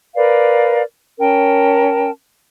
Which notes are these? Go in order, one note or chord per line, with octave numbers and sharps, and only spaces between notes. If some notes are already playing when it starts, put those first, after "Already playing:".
A#4 B4 D5 F5
C#4 A#4 G5 A5